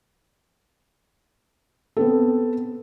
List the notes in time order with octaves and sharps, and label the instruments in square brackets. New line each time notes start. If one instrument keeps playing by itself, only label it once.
[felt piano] B3 C4 A4